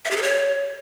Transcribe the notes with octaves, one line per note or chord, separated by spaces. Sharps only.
E5
G4
A4
C#5